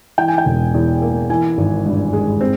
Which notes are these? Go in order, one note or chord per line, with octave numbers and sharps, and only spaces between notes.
E3 G5
G#5
G5
E1
E2
A#3
E3 G#5
G#1
G2
G#3
C4